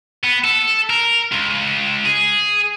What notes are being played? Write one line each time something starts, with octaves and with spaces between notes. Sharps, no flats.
B3
A4
A#4
C#2
G#4